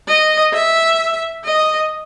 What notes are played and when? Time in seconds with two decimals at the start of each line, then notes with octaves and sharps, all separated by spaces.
0.08 D#5
0.53 E5
1.45 D#5